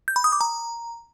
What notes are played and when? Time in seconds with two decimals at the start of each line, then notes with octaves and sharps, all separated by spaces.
0.08 G6
0.16 B5
0.24 D#6
0.32 D6
0.41 A#5